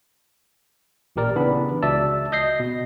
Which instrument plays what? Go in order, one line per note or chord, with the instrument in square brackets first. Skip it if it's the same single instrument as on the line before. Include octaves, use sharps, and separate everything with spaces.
[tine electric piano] A1 A#2 G4 A#4 D5
C#3 E3 B3 D4 G4 B5
C#2 F#4 D5 E5 A5 E6
D#5 G6 A#6 C7
B2